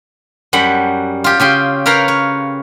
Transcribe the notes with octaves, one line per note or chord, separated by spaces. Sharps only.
F#2 G3 F#5 B5
F4 G4
C#3 G4 G5 C6
A#4 B4 C#5 F5 G5 A#5
C#5